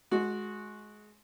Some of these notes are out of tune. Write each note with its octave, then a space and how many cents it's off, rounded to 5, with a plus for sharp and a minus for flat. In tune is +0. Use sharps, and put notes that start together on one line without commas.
G#3 +20 F#4 -10